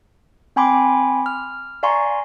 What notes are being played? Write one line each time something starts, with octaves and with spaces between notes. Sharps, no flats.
C4 G5 G#5 B5 C6 D6
F6
D5 F5 G#5 A#5 C6 C#6